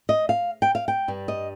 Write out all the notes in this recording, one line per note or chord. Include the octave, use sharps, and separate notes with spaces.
D#5
F5
G5
F5
G5
G2 G3
D#5